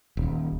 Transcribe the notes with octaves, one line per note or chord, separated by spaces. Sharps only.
D#1